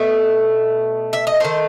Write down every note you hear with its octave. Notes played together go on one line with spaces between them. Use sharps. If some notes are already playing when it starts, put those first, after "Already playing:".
Already playing: B2 A3 E5
E5
D#5
D#3 A3 C5